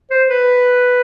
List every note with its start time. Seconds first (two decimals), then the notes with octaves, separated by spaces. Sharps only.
0.10 C5
0.29 B4